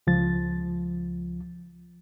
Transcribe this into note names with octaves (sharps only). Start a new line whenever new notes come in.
C#2 F3 A6